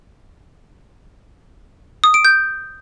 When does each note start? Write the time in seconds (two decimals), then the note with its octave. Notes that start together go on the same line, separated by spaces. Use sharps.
2.04 D#6
2.14 D7
2.25 G6